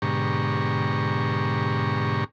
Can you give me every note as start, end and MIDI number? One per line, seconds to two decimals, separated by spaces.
0.02 2.24 44
0.02 2.24 47
0.02 2.24 50
0.02 2.24 67
0.02 2.24 82
0.02 2.24 85